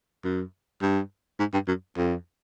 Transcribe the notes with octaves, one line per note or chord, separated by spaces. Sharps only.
F#2
G2
G#2
G2
F#2
F2